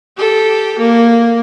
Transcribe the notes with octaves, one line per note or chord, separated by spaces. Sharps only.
G4 A4
A#3